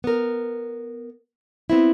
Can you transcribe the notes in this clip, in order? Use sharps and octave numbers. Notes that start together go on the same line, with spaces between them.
B3 A#4
B3 C4 E4